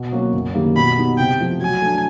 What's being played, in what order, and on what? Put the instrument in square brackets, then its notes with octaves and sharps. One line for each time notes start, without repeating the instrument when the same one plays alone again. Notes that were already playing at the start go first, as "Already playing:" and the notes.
Already playing: [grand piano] B2
F#3 A#3 C#4 F#4
F#2
D#3 G3 A#3
[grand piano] B2 [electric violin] B5
[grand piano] G3 B3 D#4
[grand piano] C3 [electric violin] G5
[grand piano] F3 A3
[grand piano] F#3 [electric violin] G#5
[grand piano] A3 D4